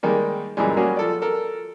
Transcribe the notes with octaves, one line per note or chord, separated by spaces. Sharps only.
D#3 G3 G#3 A#3
F#2 A#2 E3 G3 G#3
F#3 G3 A#3 C#4 F#4 G#4
F3 A4 D5
A4 A#4